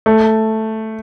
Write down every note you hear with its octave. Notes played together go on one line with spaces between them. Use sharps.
A3